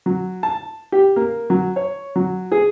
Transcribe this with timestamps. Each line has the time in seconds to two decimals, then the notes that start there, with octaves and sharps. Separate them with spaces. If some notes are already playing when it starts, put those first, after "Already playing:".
0.06 F#3
0.43 A5
0.92 G4
1.16 A#3
1.50 F#3
1.76 C#5
2.16 F#3
2.52 G#4